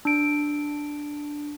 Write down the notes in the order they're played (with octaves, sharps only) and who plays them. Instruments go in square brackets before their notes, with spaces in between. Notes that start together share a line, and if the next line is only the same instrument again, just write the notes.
[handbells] D4 D7